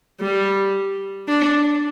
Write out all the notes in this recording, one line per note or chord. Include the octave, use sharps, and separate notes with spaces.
G3
D4